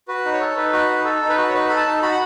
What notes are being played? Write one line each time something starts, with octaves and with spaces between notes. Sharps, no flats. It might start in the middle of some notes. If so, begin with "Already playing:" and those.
F#4 B4
D#4
C#5
A4
D#4 B4
F#4
D#4
A4
D#4
B4
F#4
C#5
D#4 B4
A4 B5
A5
D#4
F#4 B5
F#5